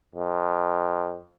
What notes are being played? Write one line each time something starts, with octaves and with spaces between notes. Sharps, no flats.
F2